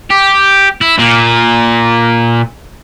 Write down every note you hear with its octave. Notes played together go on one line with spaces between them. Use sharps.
G4
E4
A#2